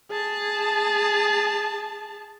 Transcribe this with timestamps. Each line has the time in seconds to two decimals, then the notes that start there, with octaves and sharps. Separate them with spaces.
0.11 G#4 A5